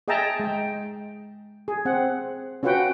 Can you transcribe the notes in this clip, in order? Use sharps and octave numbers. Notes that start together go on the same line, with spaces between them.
G#4 D#5 E5 G5 A5 A#5
G#3 G5
G#4
C4 F#5
C#4 F4 F#4 B4 F#5 G5